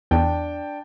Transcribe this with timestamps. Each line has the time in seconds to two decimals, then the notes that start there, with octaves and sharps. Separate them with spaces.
0.11 E2 D4 G5 A5